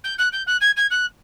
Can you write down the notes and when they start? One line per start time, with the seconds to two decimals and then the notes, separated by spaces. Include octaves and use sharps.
0.04 G6
0.18 F#6
0.32 G6
0.46 F#6
0.61 G#6
0.76 G#6
0.90 F#6